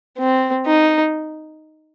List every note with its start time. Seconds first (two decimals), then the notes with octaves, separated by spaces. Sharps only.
0.19 C4
0.66 D#4